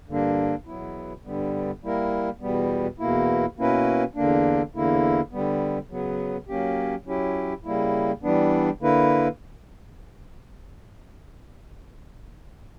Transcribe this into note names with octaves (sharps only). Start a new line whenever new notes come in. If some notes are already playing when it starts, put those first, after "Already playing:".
G2 D3 A#3 D4
E2 B2 F#3 B3 E4
G2 D3 G3 B3
G3 A#3 E4 A#4
E2 B2 G3 B3
E2 B2 A#3 E4
B2 A#3 C#4 E4 B4
E2 D3 A#3 D4
E2 D3 A#3 E4
D3 G3 B3
C#3 F#3 B3
F#3 A#3 C#4 G4
F#3 C#4 E4 G4
C#3 G3 A#3 E4
E3 G3 B3 D4
D3 A#3 E4 B4